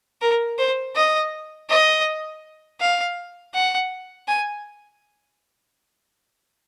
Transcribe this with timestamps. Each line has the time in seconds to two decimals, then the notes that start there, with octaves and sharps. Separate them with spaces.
0.21 A#4
0.59 C5
0.96 D#5
1.69 D#5
2.80 F5
3.54 F#5
4.28 G#5